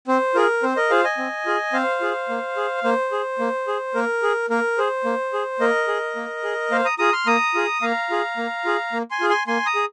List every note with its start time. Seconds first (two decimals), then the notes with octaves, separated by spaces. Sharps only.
0.08 C4 C5
0.35 F4 G#4 A#4
0.63 C4 C5
0.76 A#4 D#5
0.90 F4 G#4 C5 F5
1.04 D#5 G#5
1.18 C4
1.46 F4 G#4
1.73 C4 C5 F5
2.01 F4 G#4
2.29 A#3
2.56 G#4
2.84 A#3 C5
3.12 G#4
3.39 A#3
3.67 G#4
3.95 A#3 A#4
4.23 G#4
4.50 A#3 A#4
4.78 G#4 C5
5.05 A#3
5.33 G#4
5.60 A#3 A#4 D#5
5.88 G#4
6.16 A#3
6.43 G#4
6.71 A#3 C5 F5
6.85 A#5 D#6
6.99 F4 G#4 A#5 D#6
7.13 C6 F6
7.27 A#3 A#5 D#6
7.55 F4 G#4
7.82 A#3 F5 A#5
8.10 F4 G#4
8.37 A#3
8.65 F4 G#4
8.93 A#3
9.11 G#5 C6
9.20 F4 G#4
9.30 G#5 C6
9.47 A#3 G#5 C6
9.66 A#5 D#6
9.75 G#4